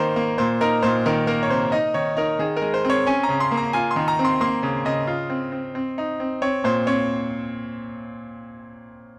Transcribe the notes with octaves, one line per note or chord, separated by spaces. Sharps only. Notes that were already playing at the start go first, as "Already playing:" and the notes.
Already playing: D#3 A#3 A#4 C5
A#3
A#2 C5
D#4 A#4
A#2 C5
D#3 A#4
A#3 A#4
C#5
C3 C5
D#4 D#5
D#3 C#5
D#4 A#4
D#3 G#4
A#4
G#3
C5
C4 C#5
C#4 G#5
A#5
C#3
C6
A#3
A#5
F4 G#5
C6
D#3
A#5
C4
C6
A#3 C6
C#3
C#3 D#5
F4
C4
C4
C4
D#4
C4
C4 C#5
A#2 C5
C4 C#5